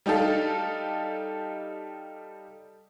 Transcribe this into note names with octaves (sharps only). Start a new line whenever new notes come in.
G3 D#4 G4 A4 F5